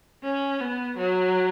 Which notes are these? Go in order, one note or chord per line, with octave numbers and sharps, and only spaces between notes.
C#4
B3
F#3